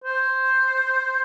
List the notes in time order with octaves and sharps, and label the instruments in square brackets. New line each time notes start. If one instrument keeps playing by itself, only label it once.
[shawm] C5